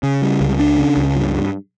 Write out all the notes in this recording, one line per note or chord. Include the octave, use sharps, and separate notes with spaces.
C#3
G3
C#2
D4
C#3
C#2
G2
G2